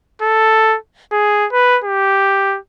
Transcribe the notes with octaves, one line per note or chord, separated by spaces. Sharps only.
A4
G#4
B4
G4